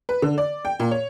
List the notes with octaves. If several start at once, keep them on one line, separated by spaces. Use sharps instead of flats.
B4
D3
D5
G5
A#2
C#5